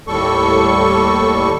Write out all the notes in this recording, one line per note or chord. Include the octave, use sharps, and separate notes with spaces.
D#2 A2 G3 A4 C#6